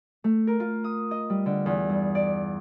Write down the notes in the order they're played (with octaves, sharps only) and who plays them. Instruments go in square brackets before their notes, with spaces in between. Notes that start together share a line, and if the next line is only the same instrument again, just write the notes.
[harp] A3
A#4
F4
D#6
D#5
G3
D3
E2
G2
D5